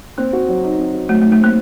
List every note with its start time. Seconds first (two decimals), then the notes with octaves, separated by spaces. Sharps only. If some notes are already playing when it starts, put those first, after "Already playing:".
0.18 A#3 C4
0.33 F#4
0.48 F#3
0.64 D#4
0.79 C4
0.94 F#4
1.09 F#3 A3
1.22 A3
1.24 D#4
1.32 A3
1.40 A#3 C4